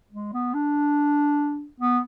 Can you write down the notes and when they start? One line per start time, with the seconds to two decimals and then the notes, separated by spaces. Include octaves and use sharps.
0.12 G#3
0.33 B3
0.54 D4
1.80 B3